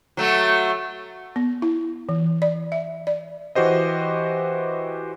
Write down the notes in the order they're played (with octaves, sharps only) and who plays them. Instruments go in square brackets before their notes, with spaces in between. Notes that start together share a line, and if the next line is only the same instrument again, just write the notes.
[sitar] F#3 A3
[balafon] B3
E4
E3
D5
E5
D5
[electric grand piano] E3 F#4 G4 C5 D#5